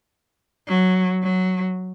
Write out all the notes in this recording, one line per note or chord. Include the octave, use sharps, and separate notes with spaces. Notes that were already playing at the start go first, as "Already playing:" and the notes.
F#3
F#3